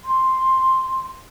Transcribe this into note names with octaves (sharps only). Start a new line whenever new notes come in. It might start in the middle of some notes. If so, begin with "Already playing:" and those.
C6